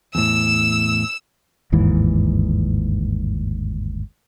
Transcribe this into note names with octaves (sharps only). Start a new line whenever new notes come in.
E2 A2 E6 E7
G1 D#2 G#2 E3